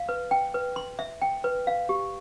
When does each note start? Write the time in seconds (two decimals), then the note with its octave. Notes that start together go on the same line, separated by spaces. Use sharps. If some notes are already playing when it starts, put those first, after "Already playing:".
Already playing: F5
0.09 B4
0.31 G5
0.54 B4
0.76 C6
0.99 E5
1.22 G5
1.44 B4
1.67 F5
1.89 G4